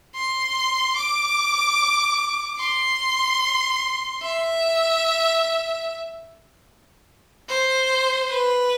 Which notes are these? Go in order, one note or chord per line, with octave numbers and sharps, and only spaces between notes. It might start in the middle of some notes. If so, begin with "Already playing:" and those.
C6
D6
C6
E5
C5
B4